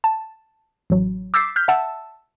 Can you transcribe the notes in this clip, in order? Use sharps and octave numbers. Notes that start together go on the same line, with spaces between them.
A5
A1 F#3
D6 E6 G6 A6 B6 C7
F6 G6 B6
E5 F#5 A5 E6